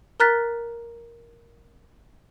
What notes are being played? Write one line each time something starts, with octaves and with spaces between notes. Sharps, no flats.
A#4 A#5 F6 F#6 A6 B6